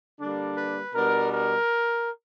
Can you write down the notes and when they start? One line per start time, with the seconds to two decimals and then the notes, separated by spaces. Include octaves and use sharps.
0.20 D3 G3 A#3 D4
0.58 B4
0.95 B2 G3 B3 D4 A#4
1.32 A#4